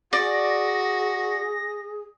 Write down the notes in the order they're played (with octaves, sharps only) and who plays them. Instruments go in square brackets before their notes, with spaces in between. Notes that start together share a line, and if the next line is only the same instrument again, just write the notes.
[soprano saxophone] F#4 [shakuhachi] G#4 [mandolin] D5 [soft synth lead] A#6